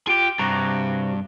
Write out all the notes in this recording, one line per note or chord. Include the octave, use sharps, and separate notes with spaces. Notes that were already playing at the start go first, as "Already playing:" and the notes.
F4 G4 G#4 G5
G2 C3 F#4 A#5